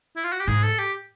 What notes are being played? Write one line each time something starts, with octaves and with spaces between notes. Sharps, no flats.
E4
F4
F#4
G4
G#2 G#4
A4
G4